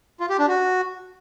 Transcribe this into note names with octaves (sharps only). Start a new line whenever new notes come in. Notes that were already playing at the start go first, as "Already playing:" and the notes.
F4
G4
D4
F#4